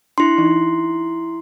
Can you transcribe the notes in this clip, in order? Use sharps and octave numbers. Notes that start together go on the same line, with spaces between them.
D4 E4 C6
E3 D#4